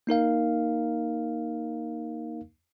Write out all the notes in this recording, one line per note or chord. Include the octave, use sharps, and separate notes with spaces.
A#3 D#4 A#4 F5